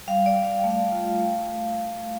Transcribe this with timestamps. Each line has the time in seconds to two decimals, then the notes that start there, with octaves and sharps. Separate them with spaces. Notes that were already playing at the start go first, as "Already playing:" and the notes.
0.08 G3 F5
0.26 D5
0.36 G3
0.45 F5
0.57 G5
0.64 A3
0.70 F5
0.92 F4
1.20 A3